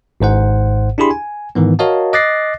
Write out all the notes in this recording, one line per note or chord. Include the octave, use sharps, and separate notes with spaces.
G#1 G#2 C5 F#5
D4 E4 G4 G#4 B5 C6
G#5
G#2 D#3 E3 B3
F#4 A#4 C#5 D#5 F5 A5
D#5 D6 F#6 A6 A#6 C7